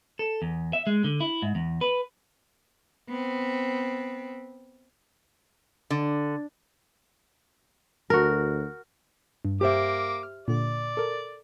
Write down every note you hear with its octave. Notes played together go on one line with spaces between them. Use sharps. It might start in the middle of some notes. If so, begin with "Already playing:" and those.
A4
E2
E5
G#3
D3
E4
G#2
E2
B4
B3 C4
D3
D2 F#4 A#4
G2
A#3 G4 C5 E5 D6
F6
A#2 D3 D5
A4 A#4